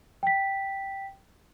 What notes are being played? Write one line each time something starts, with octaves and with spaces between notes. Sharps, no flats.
G5 B6